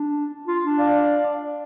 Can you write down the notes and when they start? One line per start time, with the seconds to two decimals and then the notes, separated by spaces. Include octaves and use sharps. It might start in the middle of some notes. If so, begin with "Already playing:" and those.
Already playing: D4
0.47 F4
0.64 D4
0.79 D5 F5